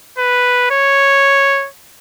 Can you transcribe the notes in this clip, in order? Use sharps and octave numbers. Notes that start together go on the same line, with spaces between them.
B4
C#5